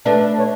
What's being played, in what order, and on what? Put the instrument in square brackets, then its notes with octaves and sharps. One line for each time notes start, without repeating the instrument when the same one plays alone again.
[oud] A3 D4 [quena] B4
[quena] C#5